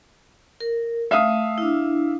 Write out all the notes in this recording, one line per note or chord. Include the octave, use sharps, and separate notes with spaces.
A#4
A3 E5 F5 D#6
D4 E4